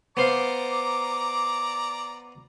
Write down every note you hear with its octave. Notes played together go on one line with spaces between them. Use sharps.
B3 C5 D5 F5 A#5 D6